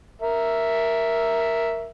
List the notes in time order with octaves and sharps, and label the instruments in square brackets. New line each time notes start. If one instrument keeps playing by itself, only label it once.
[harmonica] A#4 E5